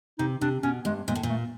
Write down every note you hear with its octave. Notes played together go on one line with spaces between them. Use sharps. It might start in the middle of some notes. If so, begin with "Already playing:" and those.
C3 D#4
C3 D4
B2 C#4
G2 G#3
A#2 G#3
A2
A#2
A3